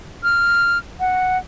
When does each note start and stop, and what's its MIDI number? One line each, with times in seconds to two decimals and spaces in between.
0.23 0.78 89
1.00 1.38 78